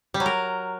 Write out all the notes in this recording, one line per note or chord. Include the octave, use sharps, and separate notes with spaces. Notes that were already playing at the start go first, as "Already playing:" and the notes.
G3
F#3
A#4